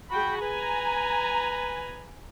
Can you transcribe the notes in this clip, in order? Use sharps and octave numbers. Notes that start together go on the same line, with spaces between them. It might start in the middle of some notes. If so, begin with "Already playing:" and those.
F#4 G#4 G5 B5
B4 G#5 A#5